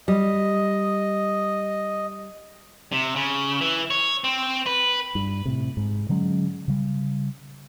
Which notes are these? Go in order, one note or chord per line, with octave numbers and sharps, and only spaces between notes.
G3 D#5
C3
C#3
E3
C#5
C4
B4
G2
A2 C3
G#2
D3 F#3 G#3 C#4
C#3 G3